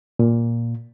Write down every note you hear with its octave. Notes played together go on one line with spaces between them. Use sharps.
A#2